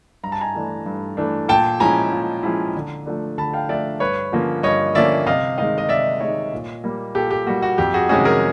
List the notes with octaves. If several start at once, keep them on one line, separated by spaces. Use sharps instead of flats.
G2 A#5
A5
G#5 A#5
E3 A3 D4
G2
E3 A3 D4
A#2 G5 A5
F3 G#3 C#4 E4 G#5 A#5
A#2
F3 G#3 C#4 E4
D3
F3 A3 D4
D3 A5 B5
F5 G5
F3 A3 D4 D5 E5
G2 B4 C#5
D3 F3 A#3 C#4
G2 C#5 D#5
D3 F3 A#3 C#4 D5 E5
C3 D#5 F5
D#3 G#3 D#5 F5
D#5
C3 D5 E5
D#3 G#3 C#5 D#5
A#2
G3 A#3
A#2 G4 A4
G4
G3 A#3 F#4
F#4
F2 G4
F#4 G#4
C3 D#3 G#3 C#4 F#4 G#4
G#4 A#4